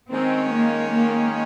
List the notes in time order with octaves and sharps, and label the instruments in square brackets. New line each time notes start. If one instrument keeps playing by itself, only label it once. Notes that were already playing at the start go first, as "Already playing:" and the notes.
[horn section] D#3 G#3 C#4 [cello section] C4
[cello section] A#3
A#3